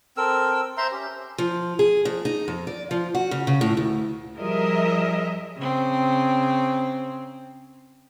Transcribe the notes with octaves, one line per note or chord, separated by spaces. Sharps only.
C4 A4 A#4 E6
C5 E5 A#5 C6
C#4 G4
F3
G#4
F2
D#4
F2
D5
F3
F#4
C#3
C#3
A2
D2
F3 G3 G#4 A#4 D#5 E5
C#3 C4